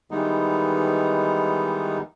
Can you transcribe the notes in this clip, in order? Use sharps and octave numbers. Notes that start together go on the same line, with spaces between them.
D#3 E3 G3 G#3 B3 D#4